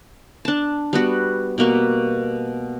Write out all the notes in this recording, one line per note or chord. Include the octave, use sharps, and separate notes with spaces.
D4 A5
G3 B3 F#4
B2 G3 A#3 F#4